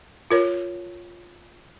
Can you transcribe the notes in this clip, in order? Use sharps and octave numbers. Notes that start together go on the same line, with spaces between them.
F4 A#4 C#5